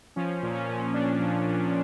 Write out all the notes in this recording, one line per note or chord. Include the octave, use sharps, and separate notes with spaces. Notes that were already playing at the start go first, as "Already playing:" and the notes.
F3 C#4
A#2
C#4
A#2
F3 D4
F3
A#2